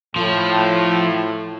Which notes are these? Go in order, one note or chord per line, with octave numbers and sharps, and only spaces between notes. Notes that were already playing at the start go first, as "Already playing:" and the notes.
A2 F3